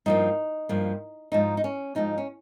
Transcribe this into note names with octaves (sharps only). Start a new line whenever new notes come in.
G2 F3 A#3 D#4
G2 F3 A#3
G#2 F3 G#3 D#4
D#4
C#4
G#2 F3 G#3 D#4
C#4